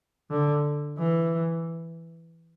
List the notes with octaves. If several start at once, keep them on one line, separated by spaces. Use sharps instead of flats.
D3
E3